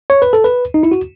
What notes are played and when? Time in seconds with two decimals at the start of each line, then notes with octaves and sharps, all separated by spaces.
0.10 C#5
0.22 B4
0.33 A4
0.44 B4
0.74 D#4
0.83 E4
0.92 F#4